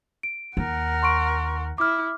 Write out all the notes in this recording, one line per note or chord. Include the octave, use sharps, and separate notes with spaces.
D7
D#2 A#4 F#5
C6 C#6 D7
E4 D6 F6